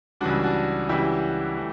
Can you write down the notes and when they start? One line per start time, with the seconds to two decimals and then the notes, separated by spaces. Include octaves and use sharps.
0.21 C#2 C#3 E3 G3 D4 F#4
0.44 D4 F#4
0.89 C#2 C#3 E3 G3 E4 G4
1.57 E3 A3